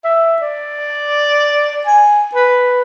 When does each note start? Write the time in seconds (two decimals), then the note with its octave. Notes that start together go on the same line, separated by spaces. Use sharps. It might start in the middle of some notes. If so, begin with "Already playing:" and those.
0.04 E5
0.42 D5
1.86 G#5
2.35 B4